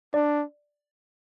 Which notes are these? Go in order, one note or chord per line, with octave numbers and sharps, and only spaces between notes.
D4 D5